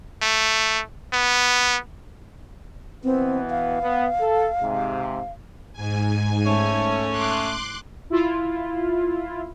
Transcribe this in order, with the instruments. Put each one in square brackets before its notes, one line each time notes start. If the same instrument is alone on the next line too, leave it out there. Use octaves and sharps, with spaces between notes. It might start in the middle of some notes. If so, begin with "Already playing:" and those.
[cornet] A3
B3
[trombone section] B2 E3 B3 [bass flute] C4
[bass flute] F5
[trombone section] B3
A4
G#2 C3
[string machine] G#2 G#5
[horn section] A3 C#4
[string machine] C6 D6 F#6
[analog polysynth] E4 F4